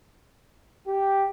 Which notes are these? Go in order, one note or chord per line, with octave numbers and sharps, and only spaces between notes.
G4